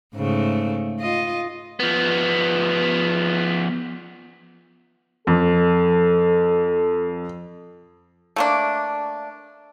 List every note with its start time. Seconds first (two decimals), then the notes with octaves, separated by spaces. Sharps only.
0.15 G#2 C#3 A3
1.00 F4 D#5
1.80 F3 B3
5.27 F2 A4
8.36 A3 A#3 D4